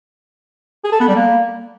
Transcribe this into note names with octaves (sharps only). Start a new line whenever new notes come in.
G#4
A4
B3
G3
A#3